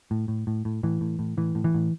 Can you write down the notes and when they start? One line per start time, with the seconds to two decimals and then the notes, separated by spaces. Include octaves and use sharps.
0.11 A2
0.28 A2
0.47 A2
0.65 A2
0.83 A2 E3
1.01 A2
1.19 A2
1.37 A2 E3
1.55 A2
1.64 E3
1.74 A2